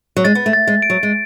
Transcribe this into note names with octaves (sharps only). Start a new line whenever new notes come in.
F#3
G#3 A6
B3
A3
A6
G#3
D7
F#3
G#3